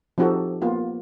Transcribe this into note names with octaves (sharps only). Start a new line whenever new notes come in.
F3 C4 D#4 F#4 G4 A4
A#3 B3 F4